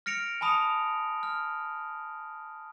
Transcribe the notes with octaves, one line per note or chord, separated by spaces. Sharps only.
F6 A#6 C#7 D7 F7
G#5 A5 B5 D#6 C#7 F7
F6